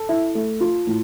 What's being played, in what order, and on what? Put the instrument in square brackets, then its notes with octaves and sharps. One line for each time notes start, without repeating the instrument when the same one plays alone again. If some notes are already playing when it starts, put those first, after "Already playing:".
Already playing: [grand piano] A4
[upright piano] E4
A3
F4
A2